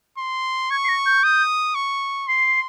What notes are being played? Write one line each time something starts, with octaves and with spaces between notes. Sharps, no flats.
C6
C#6 G#6
C7
A#6
G6
D#6
C#6
C6 C7